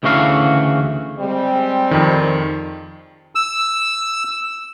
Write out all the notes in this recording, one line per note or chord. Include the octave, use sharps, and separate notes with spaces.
D2 C#3 E3 A3 F#4 F5
G3 G#3 C4
F2 D#3
E6